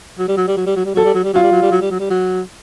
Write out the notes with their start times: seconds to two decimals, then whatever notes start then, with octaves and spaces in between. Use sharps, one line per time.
0.19 F#3
0.28 G3
0.37 F#3
0.47 G3
0.57 F#3
0.66 G3
0.76 F#3
0.86 G3
0.95 F#3 A4
1.05 G3
1.15 F#3
1.24 G3
1.34 F#3 F4
1.43 G3
1.52 F#3
1.62 G3
1.71 F#3
1.81 G3
1.91 F#3
2.00 G3
2.10 F#3